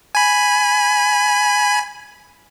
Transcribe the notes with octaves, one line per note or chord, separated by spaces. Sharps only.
G#5 B5